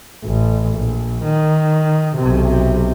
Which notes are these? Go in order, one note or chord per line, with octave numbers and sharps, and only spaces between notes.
A1
A#1
D#3
B1 C3